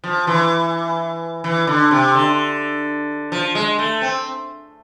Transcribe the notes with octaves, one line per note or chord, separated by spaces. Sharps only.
F3
E3
E3
D3
C3
D3
F3
G#3
A3
C4